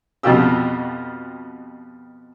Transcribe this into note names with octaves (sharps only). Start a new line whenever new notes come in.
F2 B2 F3 F#4 G4 E6